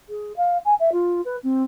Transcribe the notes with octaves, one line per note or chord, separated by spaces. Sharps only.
G#4
F5
G#5
E5
F4
B4
C4